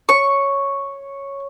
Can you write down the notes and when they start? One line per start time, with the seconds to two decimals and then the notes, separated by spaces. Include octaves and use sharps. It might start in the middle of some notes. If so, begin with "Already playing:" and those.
0.09 C#5 C#6